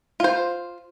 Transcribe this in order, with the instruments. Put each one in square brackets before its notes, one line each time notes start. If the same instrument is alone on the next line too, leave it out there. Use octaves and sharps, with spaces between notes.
[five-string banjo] F4 C5